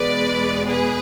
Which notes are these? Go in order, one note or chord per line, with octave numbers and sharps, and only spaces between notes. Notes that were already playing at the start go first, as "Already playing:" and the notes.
Already playing: E2 B2 G#3 B4 D5
G#4 B4